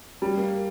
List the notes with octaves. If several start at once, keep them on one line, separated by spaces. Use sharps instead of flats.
G3
A#3